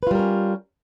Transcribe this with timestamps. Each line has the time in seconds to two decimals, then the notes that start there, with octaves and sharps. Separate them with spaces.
0.03 B4
0.07 F4
0.11 G3
0.15 A#4
0.19 C#4